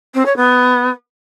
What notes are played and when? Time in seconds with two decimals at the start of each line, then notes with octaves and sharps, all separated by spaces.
0.14 C4
0.25 C#5
0.36 B3